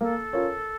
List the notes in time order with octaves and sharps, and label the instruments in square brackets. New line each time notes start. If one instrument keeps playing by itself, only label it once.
[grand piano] A#3 [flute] A4
[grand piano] C#4 F4 A#4 C#5